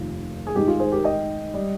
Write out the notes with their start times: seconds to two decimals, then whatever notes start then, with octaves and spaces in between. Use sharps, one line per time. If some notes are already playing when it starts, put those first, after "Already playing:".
Already playing: F1 D#2 D#3 F4
0.47 G#4
0.55 G#2 D#3 G#3 D#4 G4
0.68 F4 G#4
0.80 G#4 C5
0.92 G4 A#4
1.04 D#5 G5
1.54 G3